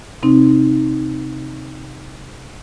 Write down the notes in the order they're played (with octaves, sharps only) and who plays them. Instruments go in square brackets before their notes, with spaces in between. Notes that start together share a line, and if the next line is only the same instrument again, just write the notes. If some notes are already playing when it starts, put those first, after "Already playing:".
[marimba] C3 C4 D#4